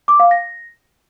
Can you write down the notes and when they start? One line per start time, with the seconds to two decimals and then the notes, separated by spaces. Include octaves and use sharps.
0.08 D6
0.20 F5
0.31 A#6